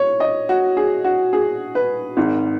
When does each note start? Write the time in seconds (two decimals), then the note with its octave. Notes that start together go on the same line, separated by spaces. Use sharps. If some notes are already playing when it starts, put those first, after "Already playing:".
Already playing: C#5
0.20 D#5
0.49 F#4
0.77 G#4
1.05 F#4
1.33 G#4
1.75 B4
2.17 G#1 G#2 D#3